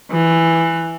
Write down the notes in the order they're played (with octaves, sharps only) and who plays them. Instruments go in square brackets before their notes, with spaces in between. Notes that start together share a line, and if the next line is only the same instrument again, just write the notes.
[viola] E3